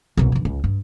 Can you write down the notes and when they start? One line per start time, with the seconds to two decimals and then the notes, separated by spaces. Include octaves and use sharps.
0.17 C2 B2
0.32 D1 E3
0.45 C#2
0.64 G2